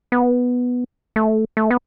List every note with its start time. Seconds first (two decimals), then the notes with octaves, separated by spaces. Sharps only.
0.12 B3
1.16 A3
1.57 A3
1.71 B3